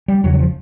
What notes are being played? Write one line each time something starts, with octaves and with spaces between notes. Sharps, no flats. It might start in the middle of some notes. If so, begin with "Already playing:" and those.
G3
E1 E2 C#3 F#3
F#3
F3